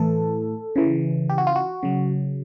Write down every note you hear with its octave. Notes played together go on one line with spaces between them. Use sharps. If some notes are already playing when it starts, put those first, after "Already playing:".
Already playing: A2 E3 A4
C#3 E3
G4
F#4
F4
F#4
C#3 F#3